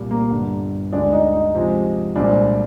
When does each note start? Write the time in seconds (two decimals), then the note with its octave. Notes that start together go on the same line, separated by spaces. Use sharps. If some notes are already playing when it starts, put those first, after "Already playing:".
Already playing: C2 A#2 G3
0.11 A#3
0.31 G1 G2 D3
0.93 D2 D3 G#3 D4
1.13 D#4
1.33 D#4
1.55 C3 F3 G#3
2.15 C2 A#2 G#3 C4 D4